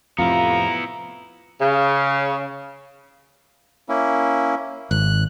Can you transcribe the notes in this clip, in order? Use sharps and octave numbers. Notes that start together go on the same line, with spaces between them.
F2 A2 C3 B3 E4 F4 A#5
C#3
A#3 C#4 E4
G#1 F#6